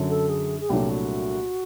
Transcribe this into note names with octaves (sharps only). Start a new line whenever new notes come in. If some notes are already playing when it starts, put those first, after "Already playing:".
Already playing: F#2 D3 F#3
A4
G#4
G#4
C2 A#2 F#3 A3 D4 G4
F#4